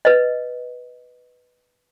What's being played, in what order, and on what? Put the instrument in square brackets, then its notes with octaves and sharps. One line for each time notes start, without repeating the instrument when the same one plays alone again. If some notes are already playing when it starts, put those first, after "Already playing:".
[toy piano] B4 D#5